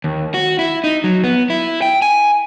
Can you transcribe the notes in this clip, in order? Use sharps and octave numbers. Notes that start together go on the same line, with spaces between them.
D#2
F#4
E4
D#4
F#3
B3
E4
G5
G#5